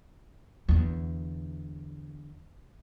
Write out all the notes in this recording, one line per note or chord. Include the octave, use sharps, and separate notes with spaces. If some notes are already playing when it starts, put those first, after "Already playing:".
E2 D3